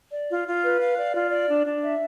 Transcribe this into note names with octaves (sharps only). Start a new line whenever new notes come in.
D5
F4
F4
B4
F5
D5
F4
D5
D4
D4
E5